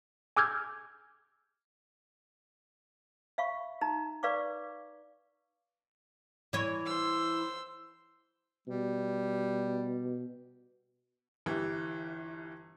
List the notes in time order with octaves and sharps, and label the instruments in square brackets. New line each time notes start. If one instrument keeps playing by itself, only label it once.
[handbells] G#5 D6 E6 F6 G6 G#6
[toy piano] E5 F5 B5 C#6
D#4 A#5
B4 D5 F5 C#6 D6
[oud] E3 C#5
[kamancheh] C5 E6
[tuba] B2 [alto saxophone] G3
[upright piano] G1 E3 G4